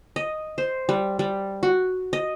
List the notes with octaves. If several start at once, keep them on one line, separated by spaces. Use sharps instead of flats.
D#5
C5
G3
G3
F#4
D#5